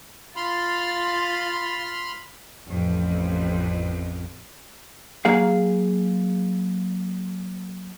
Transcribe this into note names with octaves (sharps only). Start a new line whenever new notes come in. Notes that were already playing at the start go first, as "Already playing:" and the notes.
F4 B5 C6 F6 A6
A1 F2
F#3 A#3 G#4 F5